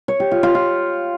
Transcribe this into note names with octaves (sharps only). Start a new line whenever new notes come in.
C#5
G4
F4
F4
F4